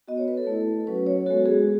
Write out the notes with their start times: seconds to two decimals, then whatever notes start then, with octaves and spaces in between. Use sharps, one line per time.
0.08 B3 F#4 D#5
0.17 C#5
0.28 B4
0.37 A4
0.47 A3 E4
0.87 F#3 C#4 F#4 B4
1.07 C#5
1.26 G#3 B3 F#4 A4
1.46 G#4